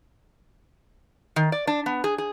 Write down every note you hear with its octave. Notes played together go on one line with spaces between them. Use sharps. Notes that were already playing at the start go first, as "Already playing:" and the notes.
D#3
D5
D4
B3
G#4
G#4